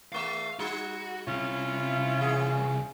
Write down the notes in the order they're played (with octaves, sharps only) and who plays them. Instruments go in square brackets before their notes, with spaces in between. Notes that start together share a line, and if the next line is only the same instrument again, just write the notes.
[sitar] E2 A3 E5 [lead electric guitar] F5
[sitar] G3 D#4 [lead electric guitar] F#4
[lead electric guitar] C2 C3 [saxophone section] C#4 E4 F4
[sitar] E2 A3 G#4